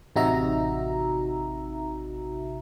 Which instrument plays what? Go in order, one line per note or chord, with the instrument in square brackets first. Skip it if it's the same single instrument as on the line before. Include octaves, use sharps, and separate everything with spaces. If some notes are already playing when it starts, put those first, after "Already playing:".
[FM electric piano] A1 C3 D#4 F#4 E5 A#5